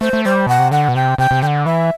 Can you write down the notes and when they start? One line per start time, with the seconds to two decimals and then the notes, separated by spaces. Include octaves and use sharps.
0.01 A3 C5
0.13 A3
0.25 G3 C5
0.47 B2 F#5
0.59 C3
0.71 D3 F#5
0.88 B2
0.95 C3 G5
1.18 C3 G5
1.31 C3
1.42 D3 F#5 G5
1.66 E3 E5